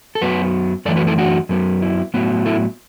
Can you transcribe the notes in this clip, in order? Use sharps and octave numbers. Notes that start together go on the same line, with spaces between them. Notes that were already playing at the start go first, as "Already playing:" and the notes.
A4
F#2 F#3 B3 F#4 B4
F#2 E3 A3 A4 D5
F#4 B4
E4 A4
D4 F#4
F#2 F#3 B3
E4
A2 F#3 B3
E4 A4